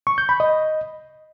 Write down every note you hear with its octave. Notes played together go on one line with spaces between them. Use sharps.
C#6
G6
B5
D#5